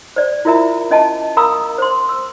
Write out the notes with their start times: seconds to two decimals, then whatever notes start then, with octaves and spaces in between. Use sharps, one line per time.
0.16 C5 D5
0.45 E4 F4 A#4 E5 A#5
0.91 C#4 D#5 G#5 A5
1.37 A#4 F5 A#5 B5 D#6 E6
1.78 C5 C6
2.09 E6